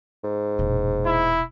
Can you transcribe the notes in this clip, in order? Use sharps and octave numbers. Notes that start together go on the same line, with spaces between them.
G#2
E1 A#2
E4